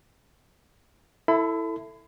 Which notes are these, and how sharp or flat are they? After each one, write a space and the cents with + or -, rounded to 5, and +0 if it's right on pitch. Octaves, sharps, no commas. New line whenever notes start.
E4 +0 A4 +15 B5 +40